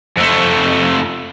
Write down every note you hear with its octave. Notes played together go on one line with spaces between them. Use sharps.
F2 A3